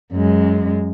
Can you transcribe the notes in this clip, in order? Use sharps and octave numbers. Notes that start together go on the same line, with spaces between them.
F#2 G#3